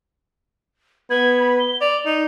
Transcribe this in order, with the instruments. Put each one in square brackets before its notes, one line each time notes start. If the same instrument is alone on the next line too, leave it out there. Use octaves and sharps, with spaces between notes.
[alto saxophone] B3 [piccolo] G#6
[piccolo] B5
G7
[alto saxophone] D5 [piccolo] F7
[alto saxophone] D#4